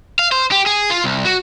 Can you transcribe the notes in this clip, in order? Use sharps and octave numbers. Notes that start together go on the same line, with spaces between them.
F5
C5
G4
G#4
F4
C2
F#4